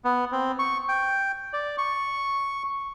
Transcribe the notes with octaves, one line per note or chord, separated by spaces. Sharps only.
B3
C4
C#6
G5
D5
C#6